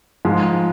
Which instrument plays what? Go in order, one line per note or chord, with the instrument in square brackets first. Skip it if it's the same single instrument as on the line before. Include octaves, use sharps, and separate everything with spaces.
[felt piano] G#2 F3 G#3